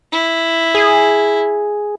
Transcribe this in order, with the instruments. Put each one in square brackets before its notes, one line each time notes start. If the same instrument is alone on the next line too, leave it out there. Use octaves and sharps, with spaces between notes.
[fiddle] E4
[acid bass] G#4